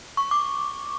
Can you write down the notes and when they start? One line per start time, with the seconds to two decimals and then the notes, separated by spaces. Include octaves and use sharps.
0.17 C#6
0.31 D6